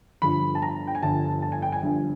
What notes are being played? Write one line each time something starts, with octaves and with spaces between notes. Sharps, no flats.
G1 G2 D3 F3 B5
A5
A#5
G5
G#5
G1 G2 D3 F3 A5
A5
G#5
G5
G#5
G1 G2 D3 F3